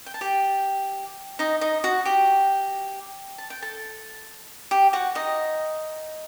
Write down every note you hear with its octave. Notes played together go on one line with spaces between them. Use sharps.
G5
A5
G4 G5
D#4 D#5
D#4 D#5
F#4 F#5
G4 G5
A5
G5
A4 A5
G4 G5
F#4 F#5
D#4 D#5